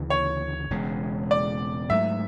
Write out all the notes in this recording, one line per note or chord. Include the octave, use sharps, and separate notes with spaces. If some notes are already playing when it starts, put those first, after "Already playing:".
Already playing: D2 C#3 E3
C#5
E1 E2 C#3 G#3
D5
G#2 F#3 A3 E5